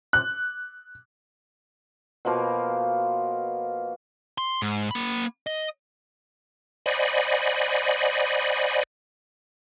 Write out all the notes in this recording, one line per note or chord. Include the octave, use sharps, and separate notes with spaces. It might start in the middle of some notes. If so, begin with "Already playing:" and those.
F#6
B2 F3 A#3 F4
C6
G#2
A#3 B5
D#5
C5 D5 D#5 F#5 G#5 B5